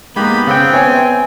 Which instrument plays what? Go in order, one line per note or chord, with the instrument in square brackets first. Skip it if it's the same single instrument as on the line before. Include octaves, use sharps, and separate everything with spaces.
[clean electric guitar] G#3 A#3 D#4 [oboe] B3 [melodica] G4 B5
[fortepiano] C#3 [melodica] C4 [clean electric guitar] F#5 G5
[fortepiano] B3 C#5 E5 [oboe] G#5